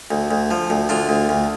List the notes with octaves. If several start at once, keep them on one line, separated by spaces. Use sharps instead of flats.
D2
D2
F3
D2
D2 D4 F4
D2
D2